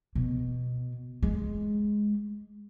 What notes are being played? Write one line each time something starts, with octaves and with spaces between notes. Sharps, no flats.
B2
G#3